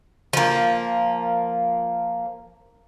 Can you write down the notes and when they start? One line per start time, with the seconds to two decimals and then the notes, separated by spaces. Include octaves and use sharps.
0.33 F3 A#3